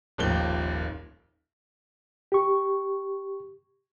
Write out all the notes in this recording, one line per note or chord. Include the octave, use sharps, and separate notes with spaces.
D#1 G#1 D#2 F3 G7
G4 C#6